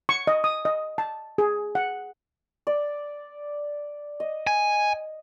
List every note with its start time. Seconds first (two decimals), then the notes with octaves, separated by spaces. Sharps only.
0.09 C#6
0.27 D#5
0.44 D#6
0.65 D#5
0.98 A5
1.38 G#4
1.75 F#5
2.67 D5
4.20 D#5
4.47 G#5